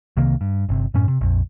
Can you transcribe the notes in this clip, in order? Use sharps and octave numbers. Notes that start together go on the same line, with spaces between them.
C2 C3 D#3 A#3
G2
G1 C3
F#2 A2 C#4
C3
A#1 F2